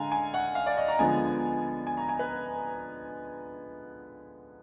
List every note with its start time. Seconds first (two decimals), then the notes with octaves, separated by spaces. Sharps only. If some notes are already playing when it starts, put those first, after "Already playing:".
Already playing: D3 G#3 F5 G#5 A#5
0.12 G#5
0.34 F#5
0.55 F5
0.66 D5
0.77 D#5
0.88 A#5
0.99 D3 F3 G#3 B3 G#5
1.87 G#5
1.97 A#5
2.09 G#5
2.19 B4